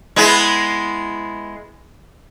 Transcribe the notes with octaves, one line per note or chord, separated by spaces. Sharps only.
G#3 B3 E4